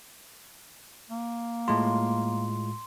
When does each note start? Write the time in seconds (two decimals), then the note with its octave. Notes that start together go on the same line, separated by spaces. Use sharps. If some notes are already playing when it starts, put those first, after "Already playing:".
1.10 A#3
1.68 A2 G#3 F4 C6